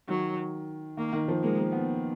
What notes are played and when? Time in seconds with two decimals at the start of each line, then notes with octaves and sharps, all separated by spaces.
0.08 D#3 F#3
0.97 D#3 A#3
1.13 D#3
1.28 F3
1.43 G#3 A#3
1.58 A#3
1.72 B3